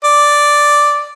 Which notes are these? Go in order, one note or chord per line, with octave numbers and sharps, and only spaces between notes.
D5